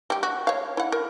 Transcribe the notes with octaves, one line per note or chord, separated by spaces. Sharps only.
G3 G4
F#4
C#5 F5
E4 F#5
A#4